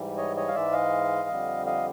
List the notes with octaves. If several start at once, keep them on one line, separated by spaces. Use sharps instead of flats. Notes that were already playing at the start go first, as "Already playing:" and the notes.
Already playing: G#2 E3 G3
C#5 D#5
C#5 D#5
F5
G#2 E3 G#3 D5 E5
D#5 F5
F2 D3 G3
D#5 F5